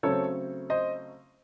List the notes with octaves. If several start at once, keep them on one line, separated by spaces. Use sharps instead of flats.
C#3 F#3 A3 C4 A4 C#5
C5 D#5